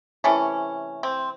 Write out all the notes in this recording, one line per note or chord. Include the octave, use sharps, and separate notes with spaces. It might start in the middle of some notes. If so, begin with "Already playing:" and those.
C3 E3 A3 C#4
C4